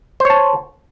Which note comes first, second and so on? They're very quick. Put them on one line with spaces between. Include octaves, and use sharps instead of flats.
C5 C#5 A5